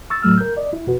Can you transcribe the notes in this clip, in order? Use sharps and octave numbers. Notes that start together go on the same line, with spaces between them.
C#6 E6 A6
F2 A2 F#3 A3 E6 F6
A#4 G6
D5 D#5
E4
F2 B2 F#4 B4